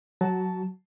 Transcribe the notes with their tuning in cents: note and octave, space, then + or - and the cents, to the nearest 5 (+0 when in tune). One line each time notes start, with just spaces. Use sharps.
F#3 +0 F#4 +15 A5 -10